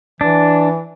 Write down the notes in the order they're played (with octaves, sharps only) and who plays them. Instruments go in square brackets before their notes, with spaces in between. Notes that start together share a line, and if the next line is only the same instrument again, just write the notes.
[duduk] E3 [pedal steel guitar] D4